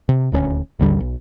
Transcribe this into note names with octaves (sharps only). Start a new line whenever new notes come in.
C3
D#1 D2 G#3 C#4
A1 D#2 D3 G3
B1